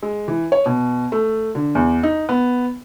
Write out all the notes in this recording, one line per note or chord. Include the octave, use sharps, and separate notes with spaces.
G#3
E3
C#5
B2
A3
D3
E2
D#4
B3